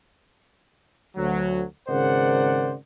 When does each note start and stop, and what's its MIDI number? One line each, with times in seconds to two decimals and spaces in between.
1.17 1.64 38
1.17 1.64 54
1.88 2.74 32
1.88 2.74 49
1.88 2.74 70
1.88 2.74 72
1.88 2.74 74
1.88 2.74 78